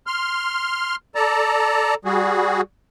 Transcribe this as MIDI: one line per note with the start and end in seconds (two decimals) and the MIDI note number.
0.07 0.96 84
0.07 0.96 89
1.15 1.94 69
1.15 1.94 74
1.15 1.94 81
1.15 1.94 82
2.05 2.61 55
2.05 2.61 66
2.05 2.61 68